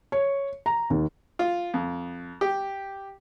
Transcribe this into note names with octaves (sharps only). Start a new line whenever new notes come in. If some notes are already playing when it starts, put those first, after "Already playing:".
C#5
A#5
D#2
F4
F2
G4